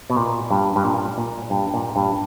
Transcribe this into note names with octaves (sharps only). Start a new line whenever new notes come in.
B2
A#2
G2
G2
A#2
A#2
G2
A#2
G2